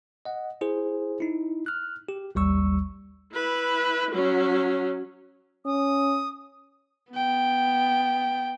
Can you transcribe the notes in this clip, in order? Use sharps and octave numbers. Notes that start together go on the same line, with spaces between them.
D#5 F#5
E4 G#4 C5
D#4 E4
F6 F#6
G4
A1 D#2 G3 C#6 E6
E4 B4
F#3 C#4
C#4 D#6
B3 G5